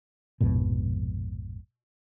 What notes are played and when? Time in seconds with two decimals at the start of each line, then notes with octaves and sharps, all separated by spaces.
0.41 A#1 F2 G#2 B2